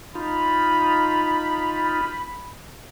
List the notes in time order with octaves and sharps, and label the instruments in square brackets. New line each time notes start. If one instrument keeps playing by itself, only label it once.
[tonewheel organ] D#4 F4 [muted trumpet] B5